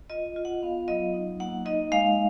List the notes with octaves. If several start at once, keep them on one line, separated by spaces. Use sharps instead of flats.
F4 D#5
F4
F#5
B3 F5
F#3 D#5
D#4
A#3 F#5
D#4 D#5
G#3 F5